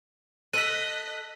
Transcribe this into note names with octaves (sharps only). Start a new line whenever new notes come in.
A4 D#5 F#6 B6 D#7